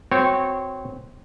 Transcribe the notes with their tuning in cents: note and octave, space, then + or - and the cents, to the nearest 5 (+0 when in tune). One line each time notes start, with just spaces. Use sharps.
C4 -15 F#4 +0 C#5 -20